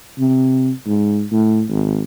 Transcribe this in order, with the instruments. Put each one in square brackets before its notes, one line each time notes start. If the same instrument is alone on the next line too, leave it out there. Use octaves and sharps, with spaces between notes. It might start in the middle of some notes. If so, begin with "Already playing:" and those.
[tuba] C3
G#2
A2
G#1